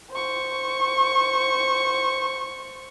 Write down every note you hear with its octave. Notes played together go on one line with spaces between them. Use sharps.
C5 C#6